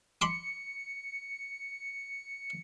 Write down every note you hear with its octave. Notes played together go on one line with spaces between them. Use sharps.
B5 C6 D6 C#7